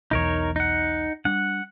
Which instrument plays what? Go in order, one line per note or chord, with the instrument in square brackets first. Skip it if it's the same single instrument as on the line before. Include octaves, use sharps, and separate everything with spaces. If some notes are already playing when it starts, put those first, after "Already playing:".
[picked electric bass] B1 E2 [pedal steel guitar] D#4 A#4 C#5
[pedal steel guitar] D#4 F#5
[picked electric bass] G3 D4 [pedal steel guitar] F#5